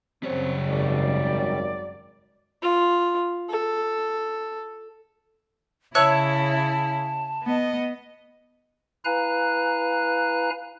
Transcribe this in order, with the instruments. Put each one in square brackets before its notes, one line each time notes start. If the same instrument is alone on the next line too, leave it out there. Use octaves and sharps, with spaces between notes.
[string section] F#2 C#3 [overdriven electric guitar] G3 C#5 [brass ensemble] C4
[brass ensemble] G#1 F#3 [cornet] D5
[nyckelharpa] F4
A4
[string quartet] C#3 E4 [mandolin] C#5 E5 F#6 [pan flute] A5
[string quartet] B3 D#5
[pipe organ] E4 B4 F5 G#5 A#5 F#6